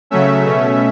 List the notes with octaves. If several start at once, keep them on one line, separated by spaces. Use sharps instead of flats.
C#3 F#3 A3 C#4 E5
B2 A3 C#4